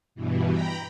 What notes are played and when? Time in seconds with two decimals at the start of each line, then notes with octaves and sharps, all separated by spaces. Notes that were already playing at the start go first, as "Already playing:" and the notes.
0.15 G2 B2 E3
0.51 G5 A#5 B5